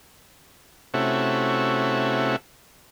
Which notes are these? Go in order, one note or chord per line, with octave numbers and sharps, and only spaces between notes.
C3 A3 C#4 E4 F#4